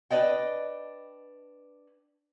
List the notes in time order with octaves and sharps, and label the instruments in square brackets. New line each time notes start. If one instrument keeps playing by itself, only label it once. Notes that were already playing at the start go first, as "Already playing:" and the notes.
[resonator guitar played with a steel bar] D4 B4 D5 D#5 G5